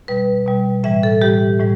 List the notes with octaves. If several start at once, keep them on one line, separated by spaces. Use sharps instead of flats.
B2 G3 B4
B2 G3
A2 E3 G3 E5
A4
A2 E3 G3 G4
A2 E3 G3